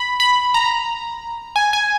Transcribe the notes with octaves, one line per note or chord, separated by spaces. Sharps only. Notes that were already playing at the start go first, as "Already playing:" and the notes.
Already playing: B5
B5
A#5
G#5
G#5